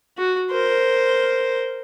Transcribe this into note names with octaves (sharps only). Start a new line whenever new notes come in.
F#4
A#4 C5